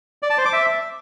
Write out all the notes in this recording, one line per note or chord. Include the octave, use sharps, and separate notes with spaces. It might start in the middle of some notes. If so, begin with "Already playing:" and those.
D5
A5
C5
D6
E5